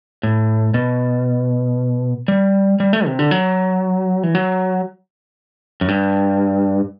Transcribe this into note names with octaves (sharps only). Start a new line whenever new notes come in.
A2
B2
G3
G3
A3
C3
D3
F#3
E3
F#3
F#2
G2